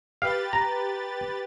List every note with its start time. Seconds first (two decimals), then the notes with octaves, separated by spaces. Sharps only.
0.22 G4 B4 F5 A6
0.53 A#5